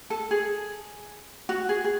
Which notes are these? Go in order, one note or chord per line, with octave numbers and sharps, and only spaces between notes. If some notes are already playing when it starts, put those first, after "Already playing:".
A4
G#4
F#4
G#4
G#4